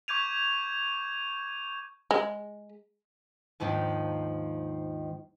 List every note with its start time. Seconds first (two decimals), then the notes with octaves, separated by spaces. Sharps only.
0.08 C#6 D6 G6 G#6 D#7 F7
2.11 G#3
3.60 D#2 G#2 D#3 F3 D4 D#4